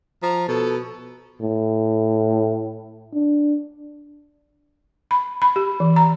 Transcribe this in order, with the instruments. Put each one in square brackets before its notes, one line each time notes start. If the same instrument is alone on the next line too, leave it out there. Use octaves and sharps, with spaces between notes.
[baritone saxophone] F3 [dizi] A#5
[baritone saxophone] B2 [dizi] A4
[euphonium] A2
D4
[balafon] B5
B5
G4
E3
A#5